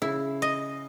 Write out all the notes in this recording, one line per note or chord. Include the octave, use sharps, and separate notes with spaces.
C#3 E4
D#5